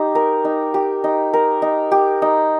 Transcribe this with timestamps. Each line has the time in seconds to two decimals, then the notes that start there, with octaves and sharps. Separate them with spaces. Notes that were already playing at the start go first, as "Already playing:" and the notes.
Already playing: D#4 G4
0.15 A#4
0.45 D#4
0.74 G4
1.04 D#4
1.33 A#4
1.62 D#4
1.91 G4
2.22 D#4